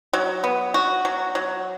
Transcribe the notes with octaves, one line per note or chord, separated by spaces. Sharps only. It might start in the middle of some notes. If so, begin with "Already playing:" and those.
F#3
B3
F#4
F#3
F#3